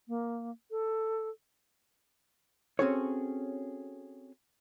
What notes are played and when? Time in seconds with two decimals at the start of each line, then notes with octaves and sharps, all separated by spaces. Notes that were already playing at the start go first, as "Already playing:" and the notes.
0.08 A#3
0.71 A4
2.79 C4 C#4 F#4 G#4 A4 C#5